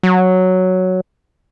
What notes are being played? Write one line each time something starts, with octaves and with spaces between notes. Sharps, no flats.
F#3